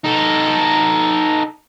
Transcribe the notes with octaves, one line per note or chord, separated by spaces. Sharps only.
D#4 A4